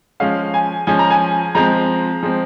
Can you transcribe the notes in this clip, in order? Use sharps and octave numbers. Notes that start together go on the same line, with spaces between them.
F3 G#3 C#4 F5
G#5
F3 G#3 C#4 G#5
A#5
G#5
F3 G#3 C4 A#5
F3 G#3 C4